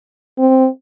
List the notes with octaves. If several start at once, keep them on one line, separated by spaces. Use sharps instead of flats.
C4